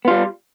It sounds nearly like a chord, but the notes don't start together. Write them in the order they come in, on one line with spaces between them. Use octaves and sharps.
B3 F4 G3